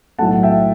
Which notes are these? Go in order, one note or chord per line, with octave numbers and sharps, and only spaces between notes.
B1 A2 F#3 A3 F#5 A5
E5 G5